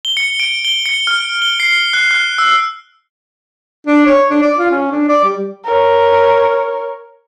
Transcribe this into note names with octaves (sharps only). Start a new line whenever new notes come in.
G7
C#7
D7
G7
C#7
F6
G7
C7
F#6
F#6
E6
D4
C#5
D4
D5
F4
C#4
D4
D5
G3
A#4 C#5